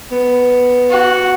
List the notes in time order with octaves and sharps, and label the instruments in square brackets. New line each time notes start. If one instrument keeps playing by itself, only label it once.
[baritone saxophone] B3
[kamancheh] F#4